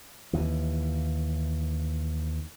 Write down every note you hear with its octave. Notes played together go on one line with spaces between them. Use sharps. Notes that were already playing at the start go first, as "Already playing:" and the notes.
D#2 E3